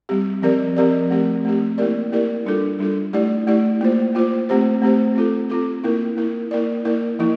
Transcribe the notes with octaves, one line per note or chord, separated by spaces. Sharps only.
G3 C4 G4
F3 C4 G4 A#4 D5
F3 C4 G4 A#4 D5
A3 C4 G4
A3 C4 G4
A#3 E4 G4 A#4 D5
A#3 E4 G4 A#4 D5
G3 D4 F4 A4
G3 D4 F4 A4
A3 E4 G4 D5
A3 E4 G4 D5
A#3 F4 C5
A#3 F4 C5
A3 C4 G4 C5
A3 C4 G4 C5
C4 F4 A4
C4 F4 A4
A#3 E4 A#4
A#3 E4 A#4
A#3 E4 A#4 D5
A#3 E4 A#4 D5
F3 A#3 E4